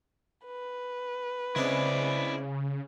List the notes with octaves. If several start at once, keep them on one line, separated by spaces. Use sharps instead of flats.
B4
C#3 G#3 C4 D4 E4 D5